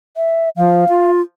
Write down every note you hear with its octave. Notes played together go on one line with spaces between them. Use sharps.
E5
F3 F5
F4